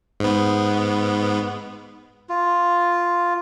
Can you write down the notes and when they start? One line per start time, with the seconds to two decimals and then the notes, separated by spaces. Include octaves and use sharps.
0.20 G#2 B3
2.29 F4